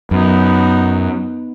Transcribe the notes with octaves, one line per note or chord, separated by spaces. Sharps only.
F#2 B3 D#4